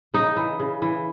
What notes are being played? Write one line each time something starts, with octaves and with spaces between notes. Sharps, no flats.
C#3 D#4
E3
C#3
E3